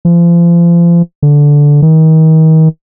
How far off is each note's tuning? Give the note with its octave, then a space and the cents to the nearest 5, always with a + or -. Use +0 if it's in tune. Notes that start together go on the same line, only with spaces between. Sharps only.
F3 -35
D3 -10
D#3 +35